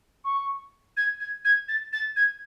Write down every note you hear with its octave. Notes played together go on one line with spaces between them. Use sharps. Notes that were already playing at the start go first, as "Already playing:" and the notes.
C#6
G#6
G#6
G#6
A6
A6
G#6